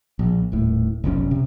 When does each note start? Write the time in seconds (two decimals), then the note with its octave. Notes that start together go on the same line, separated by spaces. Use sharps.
0.19 A#1
0.52 D#1 A2
1.04 F1 B1 C#3 C#4
1.31 C3